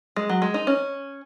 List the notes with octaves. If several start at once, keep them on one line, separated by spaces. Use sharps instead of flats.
G#3
F#3
G#3
D#4
C#4